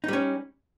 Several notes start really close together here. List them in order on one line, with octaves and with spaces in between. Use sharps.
D#4 G3 C#4